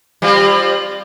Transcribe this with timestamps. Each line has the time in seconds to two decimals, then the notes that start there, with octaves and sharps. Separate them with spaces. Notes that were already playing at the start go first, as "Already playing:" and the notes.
0.22 G3 C4 F4